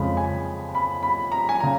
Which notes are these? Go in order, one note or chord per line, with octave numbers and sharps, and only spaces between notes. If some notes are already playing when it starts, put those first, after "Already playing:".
Already playing: F2 C#3 G#3 B5
G#5
B5
B5
A#5
G#5
C#3 A#5